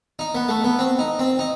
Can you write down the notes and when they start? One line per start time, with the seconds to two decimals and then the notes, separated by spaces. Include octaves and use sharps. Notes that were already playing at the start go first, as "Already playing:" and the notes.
0.19 D#4
0.35 B3
0.48 A3
0.64 B3
0.79 C4
0.99 D#4
1.19 C4
1.39 D#4